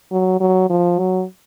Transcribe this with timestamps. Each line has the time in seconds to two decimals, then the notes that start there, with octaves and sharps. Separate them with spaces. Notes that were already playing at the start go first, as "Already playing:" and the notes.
0.12 F#3
0.41 F#3
0.70 F3
0.99 F#3